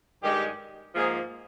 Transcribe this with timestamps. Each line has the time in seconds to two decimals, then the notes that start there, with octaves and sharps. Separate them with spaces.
0.21 G2 D#3 G#3 G4
0.94 G#2 F3 A#3 G#4